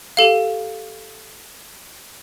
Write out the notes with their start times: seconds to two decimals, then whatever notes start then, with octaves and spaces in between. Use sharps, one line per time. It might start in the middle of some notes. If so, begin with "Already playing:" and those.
0.17 G4 A4 F5